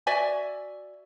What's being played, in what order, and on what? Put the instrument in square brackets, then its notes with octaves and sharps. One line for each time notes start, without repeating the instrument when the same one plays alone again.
[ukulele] F#4 D5 E5 G#5